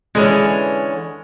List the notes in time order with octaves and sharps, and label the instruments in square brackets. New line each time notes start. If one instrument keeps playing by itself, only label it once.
[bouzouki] D3 E3 C#4 [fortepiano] G#3